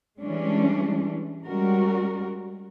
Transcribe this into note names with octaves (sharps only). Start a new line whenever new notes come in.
E3 G3 G#3 C#4 D4
G3 G#3 C#4 F#4 A#4